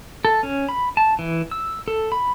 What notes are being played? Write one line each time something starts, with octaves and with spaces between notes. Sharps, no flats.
A4
C#4
B5
A5
E3
E6
A4
B5